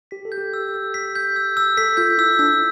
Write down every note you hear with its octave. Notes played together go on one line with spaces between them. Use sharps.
G4 B6
A4
G6
G4
E6
E6
B6
G6
E6
E6
A4 B6
F4 G6
E4 E6
D4 E6